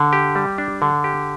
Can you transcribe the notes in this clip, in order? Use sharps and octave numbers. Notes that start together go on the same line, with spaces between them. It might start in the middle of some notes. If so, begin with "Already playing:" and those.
Already playing: D3
G4
G3
D4
D3
G4